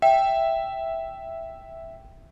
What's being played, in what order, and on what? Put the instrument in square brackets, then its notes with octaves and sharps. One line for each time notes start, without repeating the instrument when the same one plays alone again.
[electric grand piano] E5 [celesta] G5